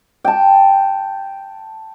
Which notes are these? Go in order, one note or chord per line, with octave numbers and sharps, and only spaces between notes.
G5 A5